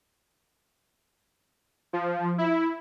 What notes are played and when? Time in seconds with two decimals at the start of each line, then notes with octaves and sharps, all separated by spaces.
1.93 F3
2.38 E4